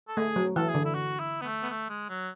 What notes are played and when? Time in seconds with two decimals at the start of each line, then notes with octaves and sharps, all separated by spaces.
0.08 A4
0.17 A3 G#4
0.36 F#3
0.56 E3 A4
0.69 G#4
0.75 D3
0.85 E4
0.95 F#4
1.19 E4
1.41 B3
1.45 A3
1.63 B3
1.70 A3
1.89 G#3
2.09 F#3